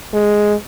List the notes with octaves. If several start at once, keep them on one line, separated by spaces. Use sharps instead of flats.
G#3